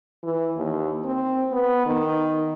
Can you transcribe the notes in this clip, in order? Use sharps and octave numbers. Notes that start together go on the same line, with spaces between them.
E3
D#2
C4
B3
D#3